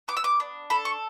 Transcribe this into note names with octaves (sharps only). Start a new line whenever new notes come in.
B3 D6
E6
D6
D4
A4 B5
C#6